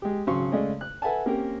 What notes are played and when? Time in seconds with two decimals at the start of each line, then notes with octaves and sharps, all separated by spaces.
0.02 G#3 G4
0.27 G#1 C#3 F#3 C6 C#6
0.52 C#3 G#3 A3 D5 D#5
0.81 F#6
1.02 A4 B4 E5 F#5 G#5 A5
1.26 A#3 C4 C#4 G4 A#4